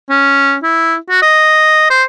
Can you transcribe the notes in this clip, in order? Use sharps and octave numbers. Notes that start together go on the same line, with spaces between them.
C#4
E4
F#4
D#5
C5